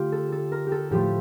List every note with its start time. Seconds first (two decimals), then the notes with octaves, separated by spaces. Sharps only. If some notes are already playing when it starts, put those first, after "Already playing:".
Already playing: D3 A3 F4 G4
0.12 A4
0.32 A4
0.52 A#4
0.67 G4 A4
0.91 A2 F3 A3 G4